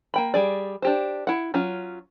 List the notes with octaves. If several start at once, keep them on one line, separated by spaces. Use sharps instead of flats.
A#3 G5 B5
G3 G#4 D5
D4 G4 C5
E4 F#5
F#3 C#4 F4